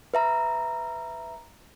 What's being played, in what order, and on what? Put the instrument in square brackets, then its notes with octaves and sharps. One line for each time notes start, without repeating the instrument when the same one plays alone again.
[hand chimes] B4 E5 A#5